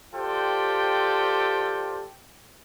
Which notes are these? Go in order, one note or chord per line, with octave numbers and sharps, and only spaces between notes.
F4 G4 A4 C5 D5 G5